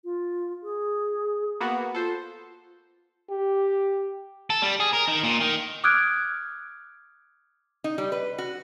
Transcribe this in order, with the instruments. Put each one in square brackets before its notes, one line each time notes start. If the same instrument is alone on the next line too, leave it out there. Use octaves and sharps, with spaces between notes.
[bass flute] F4
G#4
[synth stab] A#3 B3 F#4
[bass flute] F4 [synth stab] A4 C5
[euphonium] G4
[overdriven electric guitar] A4
G3
G#4
A#4
D#3
A#2
D#3
[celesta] D6 D#6 F6 F#6 G#6 D7
[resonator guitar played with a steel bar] D#4
G3
B4
F#4